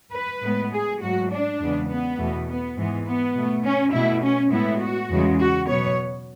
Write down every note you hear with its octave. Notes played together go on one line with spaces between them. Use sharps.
B4
A2 G#3 B3
G#4
G#2 F#3 A3 F#4
D4
E2 C#3 G#3 B3
B3
E2 B2 A3
B3
G#2 E3 G#3 B3
B3
B2 A3
C#4
B2 A3 E4
C#4
A2 G#3 B3 E4
F#4
E2 C#3 G#3
F#4
B2 F#3 B3 C#5